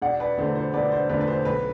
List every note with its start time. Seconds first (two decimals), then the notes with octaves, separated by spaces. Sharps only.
0.02 E1 D5 F#5
0.20 B4 D5
0.37 E2 D3 A3 C5
0.55 C5
0.74 E1 B4 D5
0.85 D5
0.92 C5
1.09 E2 D3 A3 B4 D5
1.21 B4
1.27 C5
1.45 B1 B4